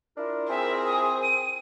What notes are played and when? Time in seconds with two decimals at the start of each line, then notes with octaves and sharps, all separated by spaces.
0.17 D4 E4 F4 A#4
0.49 C4 G#4 E5
0.86 D#6
1.23 D#7